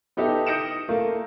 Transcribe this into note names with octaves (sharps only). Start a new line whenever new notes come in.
B3 D#4 G4 A4 E5
D#6 G6 A#6 C#7 D7 E7
A3 A#3